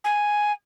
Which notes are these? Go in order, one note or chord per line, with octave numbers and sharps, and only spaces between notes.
G#5